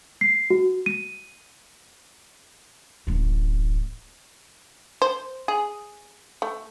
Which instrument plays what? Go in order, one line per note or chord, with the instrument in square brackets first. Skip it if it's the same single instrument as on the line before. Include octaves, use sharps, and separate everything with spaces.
[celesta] C7
F#4
D#7
[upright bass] D1 A1
[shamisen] C5
G#4
A3